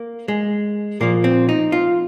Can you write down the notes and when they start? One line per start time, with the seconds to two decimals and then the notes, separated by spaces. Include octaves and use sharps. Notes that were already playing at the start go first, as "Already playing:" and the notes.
Already playing: A#3
0.28 G#3
1.01 A#2 F3 A#3
1.24 C4
1.49 D#4
1.72 F4